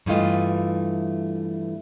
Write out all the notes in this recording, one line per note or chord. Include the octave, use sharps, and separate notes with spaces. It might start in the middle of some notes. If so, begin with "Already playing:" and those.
G2 E3 A3 F4 D#5